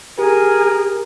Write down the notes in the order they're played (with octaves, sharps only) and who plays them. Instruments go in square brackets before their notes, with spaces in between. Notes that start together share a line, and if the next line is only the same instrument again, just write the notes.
[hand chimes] G4 [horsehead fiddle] G#4 [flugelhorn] A#4